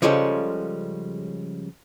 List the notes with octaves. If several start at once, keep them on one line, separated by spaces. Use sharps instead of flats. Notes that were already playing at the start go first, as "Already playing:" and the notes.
C#3 F3 G3 G#3 C#4 A4